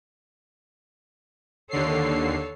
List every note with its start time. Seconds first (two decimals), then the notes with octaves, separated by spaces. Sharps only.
1.71 D#2 D3 A4 C#5 C7